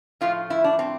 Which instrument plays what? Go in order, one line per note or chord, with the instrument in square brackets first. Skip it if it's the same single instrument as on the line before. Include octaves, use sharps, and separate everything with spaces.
[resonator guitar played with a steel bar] A2 F3 F4
E4
D4
C4